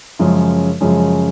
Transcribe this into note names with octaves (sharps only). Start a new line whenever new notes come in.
F#2 C#3 F3 G#3 C#4
F#2 C#3 F3 G#3 C#4